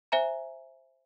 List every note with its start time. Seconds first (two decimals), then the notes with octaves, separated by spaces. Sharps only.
0.12 C5 E5 G#5 A#5